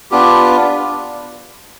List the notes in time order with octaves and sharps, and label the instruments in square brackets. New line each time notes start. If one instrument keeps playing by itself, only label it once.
[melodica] B3 D4 F4 G4